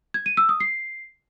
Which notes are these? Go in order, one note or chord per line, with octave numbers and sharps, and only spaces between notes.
G#6
D#7
E6
D#6
C7